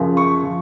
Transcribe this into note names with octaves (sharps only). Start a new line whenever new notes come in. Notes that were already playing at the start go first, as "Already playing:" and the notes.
Already playing: F#2 C#3 F3
C#6
F3